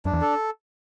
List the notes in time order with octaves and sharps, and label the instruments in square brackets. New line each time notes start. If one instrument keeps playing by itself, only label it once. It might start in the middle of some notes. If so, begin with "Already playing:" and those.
[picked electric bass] F#2 [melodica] D4
[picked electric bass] E2
[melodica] A4